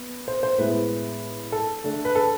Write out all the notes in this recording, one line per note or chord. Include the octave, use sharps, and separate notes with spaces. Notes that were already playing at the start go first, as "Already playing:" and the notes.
Already playing: B3
C5
C5
A2 G#3 B3 E4 B4
A4
D3 A3 D4
B4
A4